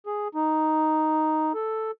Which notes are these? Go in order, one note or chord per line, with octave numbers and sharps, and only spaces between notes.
G#4
D#4
A4